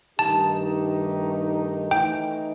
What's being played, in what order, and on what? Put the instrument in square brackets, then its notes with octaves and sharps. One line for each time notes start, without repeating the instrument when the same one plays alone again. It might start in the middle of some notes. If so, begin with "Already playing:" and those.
[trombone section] G2 D#3 A3 D#4 G4 [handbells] A5
[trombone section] A2 E3 A3 D#4 [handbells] G5